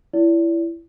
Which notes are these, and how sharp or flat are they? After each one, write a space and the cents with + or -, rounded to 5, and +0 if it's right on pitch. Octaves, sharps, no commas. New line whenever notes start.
E4 +20 D5 -35